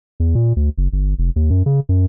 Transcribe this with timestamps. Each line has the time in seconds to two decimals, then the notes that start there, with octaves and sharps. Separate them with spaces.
0.20 E2
0.35 A#2
0.56 D2
0.78 F#1
0.93 G1
1.19 F1
1.36 D#2
1.50 F#2
1.66 C#3
1.89 F#2